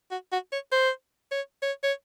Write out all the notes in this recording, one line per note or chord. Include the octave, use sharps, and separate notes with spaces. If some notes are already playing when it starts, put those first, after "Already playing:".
F#4
F#4
C#5
C5
C#5
C#5
C#5